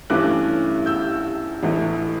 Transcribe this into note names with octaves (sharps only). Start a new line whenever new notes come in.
G2 E3 A3 C#4 D6 F#6
E6 G6
A1 A2 E3 A3